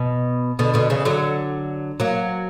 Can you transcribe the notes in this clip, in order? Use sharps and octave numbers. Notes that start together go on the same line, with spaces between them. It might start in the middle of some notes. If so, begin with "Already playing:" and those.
Already playing: B2
B2 D3
B2 D3
C#3 E3
D3 F#3
F#3 A#3